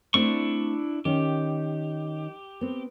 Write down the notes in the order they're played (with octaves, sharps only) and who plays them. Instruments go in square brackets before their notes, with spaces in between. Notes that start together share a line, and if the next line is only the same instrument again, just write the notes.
[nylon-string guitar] A3 C4 C5 [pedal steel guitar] D4 E4 C#6
[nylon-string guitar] D#3 C#4 [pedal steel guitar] G4
[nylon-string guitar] B3 C4